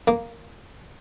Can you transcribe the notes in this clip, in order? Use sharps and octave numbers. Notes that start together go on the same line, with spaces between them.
A#3